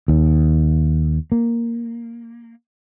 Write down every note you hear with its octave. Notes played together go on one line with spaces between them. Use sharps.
D#2
A#3